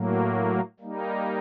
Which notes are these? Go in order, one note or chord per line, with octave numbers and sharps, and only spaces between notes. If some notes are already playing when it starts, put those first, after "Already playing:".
Already playing: A2 F#3 A#3
G3 A#3 D#4